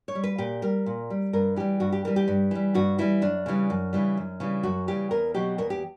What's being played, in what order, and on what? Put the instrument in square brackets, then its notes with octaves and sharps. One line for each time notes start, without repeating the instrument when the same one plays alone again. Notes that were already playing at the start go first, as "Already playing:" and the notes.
[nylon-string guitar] C#5
G3
B4
A#2 G4
G3 A#4
A#2
G3
G2 A#4
E3 G3 G4
G2 F#4
G4
E3 G3 A#4
G4
G2
E3 G3
G2 F#4
E3 G3 E4
F#2 D4
C#3 E3 G3
F#2
C#3 E3 G3
F#2
C#3 E3 G3
F#2 F#4
C#3 E3 G3 G4
E2 A#4
B2 F#3 G4
E2 A#4
G4